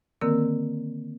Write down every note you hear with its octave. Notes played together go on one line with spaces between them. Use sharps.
D3 D#3 A#3 C4 A#4 E6